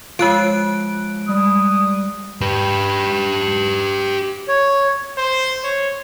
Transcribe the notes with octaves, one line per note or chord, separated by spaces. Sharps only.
F3 G#3 F#6 D7
G3 D#6
G4 B4
C#5
C5
C#5